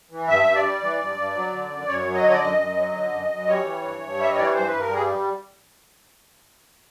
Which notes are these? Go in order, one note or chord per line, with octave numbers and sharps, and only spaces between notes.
E3
G2 E5
G2
D5
G3
E3
G2
G2
F#3
D3
F#2
F#2 C#5
F#3
D#5
D3 C#5
D5
F#2 D#5
F#2
F#3
D3
F#2
F#2
G3 C#5
E3
G2
G2
G3 E5
D#5
E3 D5
C#5
G2 C5
G2 B4
A#4
G3 G#4